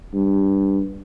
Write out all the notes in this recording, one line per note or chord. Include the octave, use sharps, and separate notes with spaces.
G2